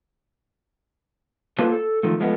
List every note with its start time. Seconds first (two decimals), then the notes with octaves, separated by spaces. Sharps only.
1.59 A#3 F4 A4 B4 C5
1.72 A4
2.03 D#3 F3 A3
2.20 F3 G#3 A3 B3